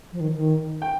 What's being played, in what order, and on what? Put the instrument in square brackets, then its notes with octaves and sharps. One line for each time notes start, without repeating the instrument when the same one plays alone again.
[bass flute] F3
D#3
D#3
[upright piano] G5